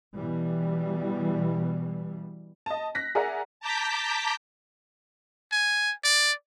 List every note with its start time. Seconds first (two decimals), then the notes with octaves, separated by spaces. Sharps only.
0.15 B2 E3 G3
2.66 D#5 A5
2.95 F#6 A#6 B6
3.15 G#4 A#4 D5 E5 F#5 A#5
3.60 A5 A#5 D6 G6 B6
5.52 G#5
6.04 D5